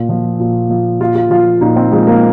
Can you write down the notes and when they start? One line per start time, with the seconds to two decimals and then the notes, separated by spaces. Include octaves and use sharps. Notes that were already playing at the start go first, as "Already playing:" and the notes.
Already playing: A#2
0.09 F3
0.40 A#2
0.70 F3
1.00 A#2 F4
1.15 F4
1.30 F3 F4
1.61 A#2 D#4
1.76 C4
1.92 F3 G#3
2.07 A#3